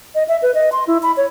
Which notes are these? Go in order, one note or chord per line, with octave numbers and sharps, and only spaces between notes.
D#5
E5
B4
D#5
C6
E4
B5
C#5